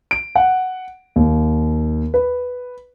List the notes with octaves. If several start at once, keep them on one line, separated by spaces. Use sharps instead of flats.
D7
F#5
D#2
B4